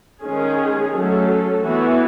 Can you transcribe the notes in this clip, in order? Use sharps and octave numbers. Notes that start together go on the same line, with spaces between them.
D#3 G#3 C#4 G#4
F#3 A3 C#4 A4
E3 B3 F#4